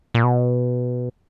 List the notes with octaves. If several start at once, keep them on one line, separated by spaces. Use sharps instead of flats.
A#2
B2